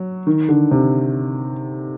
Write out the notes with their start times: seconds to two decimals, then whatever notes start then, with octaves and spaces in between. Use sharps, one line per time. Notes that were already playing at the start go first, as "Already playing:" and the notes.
Already playing: F#3
0.27 D#3
0.49 D3
0.71 C3